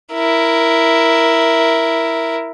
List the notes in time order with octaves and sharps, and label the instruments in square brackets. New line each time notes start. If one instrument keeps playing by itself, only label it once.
[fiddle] E4 A#4